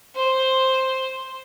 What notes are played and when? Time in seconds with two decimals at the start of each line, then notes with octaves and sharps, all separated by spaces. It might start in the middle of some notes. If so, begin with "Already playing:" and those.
0.15 C5